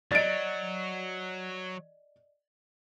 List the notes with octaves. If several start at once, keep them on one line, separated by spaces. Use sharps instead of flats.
F#3 D5 D#5 A6 D7